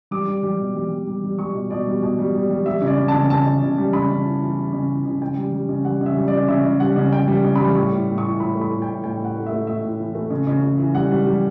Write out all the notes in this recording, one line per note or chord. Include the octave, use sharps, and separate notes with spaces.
G3 D6
G3
G3
B2
G3
G3
G3
G3
G3 C#6
B2
B2 D5
G3
B2
G3
G3
G3
G3 E5
C#3
D5
C#3
A5
C#3
C#3 A5
C#3
C#3
G3
C#3 B5
C#3
E3
E3
E3
C#3
E3
C#3
C#3 G5
G3
G3
C#3
G3 F#5
C#3 E5
G3
C#3 D5
C#3 E5
C#3
G3 F#5
C#3
C#3 G5
G3
C#3
G3 B5
A2 C#6
A2
A2
C#6
E3
A2 B5
A3
B5
A2
G5
A2
A2 G5
A2
F#5
A3
E5
A3
A2 E5
A2
E3
A3
C#3
C#3
C#3
E3
G3 F#5
G3
G3